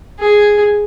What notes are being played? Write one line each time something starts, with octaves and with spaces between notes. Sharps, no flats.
G#4